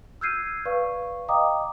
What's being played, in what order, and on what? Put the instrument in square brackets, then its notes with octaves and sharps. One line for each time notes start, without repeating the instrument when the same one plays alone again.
[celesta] E6 F6 G6 G#6 C7 D#7
B4 D5 F5 C#6
D#5 F5 G5 A#5 D6 D#6